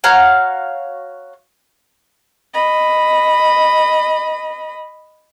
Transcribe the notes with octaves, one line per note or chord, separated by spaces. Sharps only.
F#4 C#5 F5 A#5
D#5 B5